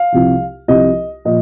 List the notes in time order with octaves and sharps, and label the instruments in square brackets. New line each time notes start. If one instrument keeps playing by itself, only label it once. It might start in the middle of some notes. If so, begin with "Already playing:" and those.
Already playing: [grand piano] F5
C2 C3 F3
C2 C3 F3 D#5
A#2 F3 D#5